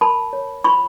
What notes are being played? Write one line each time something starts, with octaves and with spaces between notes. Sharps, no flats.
A#4 A5 B5
C#5
F4 B5 C#6